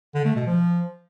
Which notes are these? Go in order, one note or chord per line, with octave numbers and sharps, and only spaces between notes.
D3
A3
B2
F3